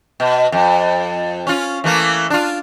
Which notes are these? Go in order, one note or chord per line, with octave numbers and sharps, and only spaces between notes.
B2
F2
C#4 F4
E3 A3 A#3
D4 F4